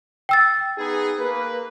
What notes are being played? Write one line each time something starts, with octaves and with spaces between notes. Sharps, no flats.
G5 E6 A6
B3 D#4 G#4
A#3 B4